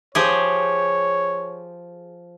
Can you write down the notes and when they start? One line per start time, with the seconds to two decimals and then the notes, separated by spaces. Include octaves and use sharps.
0.15 F3 G4 G#4 C#5